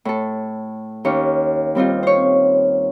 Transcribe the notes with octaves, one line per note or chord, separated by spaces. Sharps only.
A2 A4
D#2 C#4 C#5
G3 C4 D#4 F4
C5 C#5